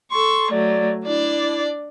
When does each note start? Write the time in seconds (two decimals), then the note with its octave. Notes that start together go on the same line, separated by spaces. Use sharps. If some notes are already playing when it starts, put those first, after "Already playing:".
0.11 A4 C6 C#6
0.51 F#3 A3 D5
1.05 D4 E4 D5